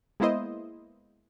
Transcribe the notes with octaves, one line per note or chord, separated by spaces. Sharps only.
G#3 A#3 B3 E4 C5 D#5